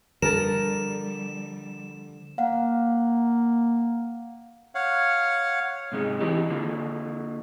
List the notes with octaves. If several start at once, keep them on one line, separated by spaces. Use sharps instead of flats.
D3 F3 G3 A4 A#4 E7
A#3 F5 F#5
C#5 F5 F#5
G#2 C3 G#3 D#4
E3 C4 D#4 E4 G4
D3 A#3 F4